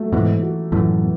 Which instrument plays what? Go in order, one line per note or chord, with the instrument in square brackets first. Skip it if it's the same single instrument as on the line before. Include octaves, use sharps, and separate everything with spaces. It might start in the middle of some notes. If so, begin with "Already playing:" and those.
Already playing: [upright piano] F#3 A3
[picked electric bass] G#2 B2 [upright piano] E3
[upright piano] F#4
[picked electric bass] F#2 A2 [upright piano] E3
[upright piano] B3